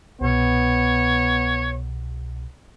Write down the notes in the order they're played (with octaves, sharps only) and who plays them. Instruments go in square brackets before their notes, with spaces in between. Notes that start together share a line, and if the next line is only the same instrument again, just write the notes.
[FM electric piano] C2 B2 [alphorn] B3 [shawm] C#5